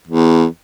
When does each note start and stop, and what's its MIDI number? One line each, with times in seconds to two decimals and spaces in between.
0.07 0.45 40